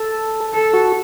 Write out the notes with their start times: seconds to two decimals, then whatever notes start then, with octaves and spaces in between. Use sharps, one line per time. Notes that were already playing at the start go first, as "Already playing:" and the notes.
Already playing: A4
0.53 A4
0.73 F#4